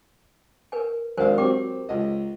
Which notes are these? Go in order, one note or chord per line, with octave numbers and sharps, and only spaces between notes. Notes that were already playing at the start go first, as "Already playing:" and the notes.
A#4 B4 G#5
G#1 D4 A#4 C5 F5 G#5
F#3 C4 G4 G5 D6
C#2 D#5